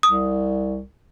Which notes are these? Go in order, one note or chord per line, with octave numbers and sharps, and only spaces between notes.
C2 D#6